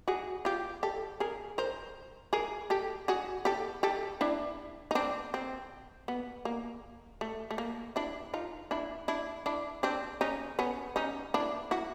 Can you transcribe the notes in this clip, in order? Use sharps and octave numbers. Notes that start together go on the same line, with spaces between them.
F#4 G#4
F4 G4
G4 A4
G#4 A#4
A#4 C5
G#4 A#4
G4 A4
F#4 G#4
G4 A4
G4 A4
D4 E4
D#4
C4 D4
C4
B3
A#3
A3
A3
A#3
D4 E4
D#4 F4
D4 E4
D4 E4
D4 E4
C4 D4
C#4 D#4
B3 C#4
C#4 D#4
D4 E4
E4 F#4